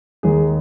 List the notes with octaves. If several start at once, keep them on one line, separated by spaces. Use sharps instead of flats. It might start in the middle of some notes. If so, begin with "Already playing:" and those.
D#2 D#3 G#3 G#4